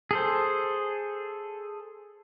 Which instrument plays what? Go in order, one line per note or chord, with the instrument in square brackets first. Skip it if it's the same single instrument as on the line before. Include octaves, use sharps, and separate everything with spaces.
[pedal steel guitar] G#4 A4 C5